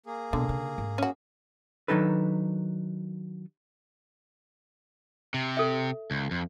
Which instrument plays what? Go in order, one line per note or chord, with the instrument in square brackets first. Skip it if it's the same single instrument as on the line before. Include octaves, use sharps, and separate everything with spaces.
[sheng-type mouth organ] A#3 G#4
[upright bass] B2 [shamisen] D3
[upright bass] C#3
G#2
[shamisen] C#4 F#4
[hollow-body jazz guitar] D#3 F#3 D4 D#4 A4 B4
[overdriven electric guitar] C3
[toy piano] A4 E5
[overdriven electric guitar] C#2
F2